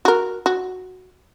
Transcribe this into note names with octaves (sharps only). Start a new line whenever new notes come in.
F#4 A#4
F#4